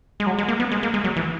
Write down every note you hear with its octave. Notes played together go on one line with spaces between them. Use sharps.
G#3
F#3
G#3
A#3
B3
G#3
A#3
G#3
F#3
E3